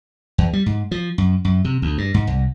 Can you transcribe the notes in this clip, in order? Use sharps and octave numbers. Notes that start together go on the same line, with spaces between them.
E2
G3
G#2
F3
F#2
F#2
C3
D2
G2
G#2
C2